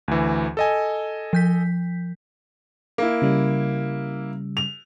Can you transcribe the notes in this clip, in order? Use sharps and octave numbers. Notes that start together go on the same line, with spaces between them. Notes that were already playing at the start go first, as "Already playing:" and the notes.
D2 E3
A4 D#5 G#5
F3 G6 B6
A#3 E4
C#3 G3
F7